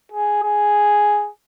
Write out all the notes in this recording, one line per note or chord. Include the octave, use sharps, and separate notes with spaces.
G#4
G#4